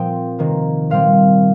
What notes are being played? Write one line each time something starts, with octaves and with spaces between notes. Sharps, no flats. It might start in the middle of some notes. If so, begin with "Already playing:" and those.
Already playing: A#2 F3 C4 G5
C3 D#3 A#3
A#2 G3 C4 F5